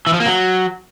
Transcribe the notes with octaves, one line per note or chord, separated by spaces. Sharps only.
E3
F3
A#3
F#3